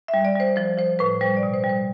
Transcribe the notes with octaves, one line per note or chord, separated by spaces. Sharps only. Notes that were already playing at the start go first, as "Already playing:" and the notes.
E5
G3
D5
G3 C5
F3 C5
F3 C5
A2 B4
G3 C5
D5
B2
C5
G3
C5